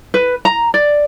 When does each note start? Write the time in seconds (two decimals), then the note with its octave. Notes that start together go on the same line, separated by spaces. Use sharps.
0.14 B4
0.45 A#5
0.74 D5